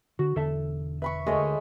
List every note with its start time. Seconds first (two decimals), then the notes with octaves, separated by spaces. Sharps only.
0.19 D3 F#4
0.36 E1 D3 A4 E5 A5
1.02 B4 E5 B5 C#6
1.26 D2 G#3 A3 A#4 C#5 D#5